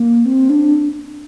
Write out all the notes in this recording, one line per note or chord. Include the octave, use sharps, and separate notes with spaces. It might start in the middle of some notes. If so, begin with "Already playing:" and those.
Already playing: A#3
C4
D4